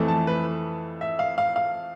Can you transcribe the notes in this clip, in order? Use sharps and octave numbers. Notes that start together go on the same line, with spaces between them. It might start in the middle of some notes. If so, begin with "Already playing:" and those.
Already playing: F2 E3 A3
A5
B4
E5
F5
F5
F5